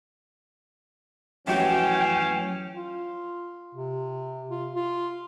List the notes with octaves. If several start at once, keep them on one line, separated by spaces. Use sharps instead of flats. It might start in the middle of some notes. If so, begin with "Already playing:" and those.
F#2 E3 F3 A3 C#4 F#4 G4 G5
F4
C3
F4
F4